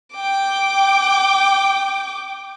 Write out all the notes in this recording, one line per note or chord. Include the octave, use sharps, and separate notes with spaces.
G5 D6